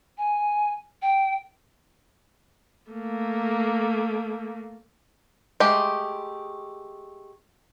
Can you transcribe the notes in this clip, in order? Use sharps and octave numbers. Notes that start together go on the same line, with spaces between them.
G#5
G5
A3 A#3
G#3 A3 G4